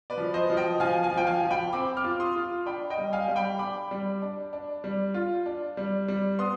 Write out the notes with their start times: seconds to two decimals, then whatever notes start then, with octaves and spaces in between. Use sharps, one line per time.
0.10 B4 D5
0.17 F3
0.34 C5 D#5
0.50 F3
0.57 D#5 G5
0.80 F3 F5 G#5
1.03 F5 G#5
1.11 F3
1.17 G5
1.27 F5 G#5
1.42 F3
1.51 G5 B5
1.73 C4 B5 D6
1.97 D6 F6
2.04 F4
2.20 C6 D#6
2.36 F4
2.66 D4 G5 B5
2.90 D#5 G5
2.98 G3
3.13 F5 G#5
3.28 G3
3.36 G5 B5
3.59 D4 B5 D6
3.91 G3
4.22 D4
4.53 D4
4.84 G3
5.14 F4
5.46 D4
5.77 G3
6.08 G3
6.39 B3 C6 D#6